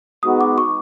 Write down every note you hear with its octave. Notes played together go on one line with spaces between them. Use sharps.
G#3 B3 D#4 F#4 D#6
D6
C#6